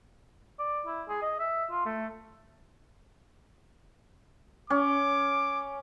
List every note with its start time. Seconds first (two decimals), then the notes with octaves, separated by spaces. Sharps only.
0.59 D5
0.87 E4
1.08 G#4
1.22 D#5
1.39 E5
1.70 F4
1.85 A3
4.70 C#4 D6